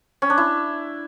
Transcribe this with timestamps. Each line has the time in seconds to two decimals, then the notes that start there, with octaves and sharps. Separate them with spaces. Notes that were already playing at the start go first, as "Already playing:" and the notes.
0.22 C#4
0.30 D4
0.38 E4